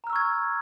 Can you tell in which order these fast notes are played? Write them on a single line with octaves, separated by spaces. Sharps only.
A#5 F6 E6 C#6 G#6